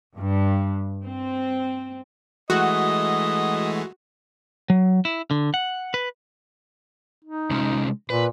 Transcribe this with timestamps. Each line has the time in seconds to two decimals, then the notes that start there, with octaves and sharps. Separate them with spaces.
0.16 G2
1.03 C4
2.50 E3 G#3 A3 F#4 D#5
4.70 F#3
5.05 E4
5.31 D3
5.54 F#5
5.94 B4
7.25 D#4
7.51 C3 G#3 C#4
8.10 A#2 B4